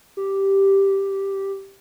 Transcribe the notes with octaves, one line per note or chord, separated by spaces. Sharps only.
G4